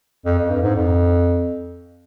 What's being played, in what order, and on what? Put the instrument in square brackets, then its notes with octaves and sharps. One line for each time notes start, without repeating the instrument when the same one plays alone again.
[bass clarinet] F2
F2
G2
G#2
F2